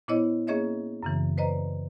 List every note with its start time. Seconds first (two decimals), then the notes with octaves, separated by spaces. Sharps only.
0.08 A#2 B3 E4 C5 C#5 D#5
0.47 A#3 C#4 G#4 C#5 D#5 E5
1.03 F#2 C#3 E3
1.37 B4 C5 D5 D#5 A#5